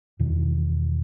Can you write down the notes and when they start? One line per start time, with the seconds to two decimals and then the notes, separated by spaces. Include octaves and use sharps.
0.20 E2 B2 D#3